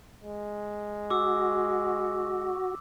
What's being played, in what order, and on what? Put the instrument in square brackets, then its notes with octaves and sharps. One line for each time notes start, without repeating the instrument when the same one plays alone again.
[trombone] G#3
[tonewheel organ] F#4 [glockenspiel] D6 E6